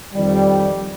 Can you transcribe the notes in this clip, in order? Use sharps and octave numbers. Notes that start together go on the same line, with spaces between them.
F2 D#3 G3